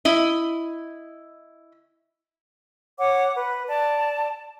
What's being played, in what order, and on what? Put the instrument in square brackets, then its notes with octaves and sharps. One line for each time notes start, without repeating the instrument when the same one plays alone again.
[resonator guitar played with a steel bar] E4 D#5
[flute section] C#5 F#5 D6
B4
D5 A5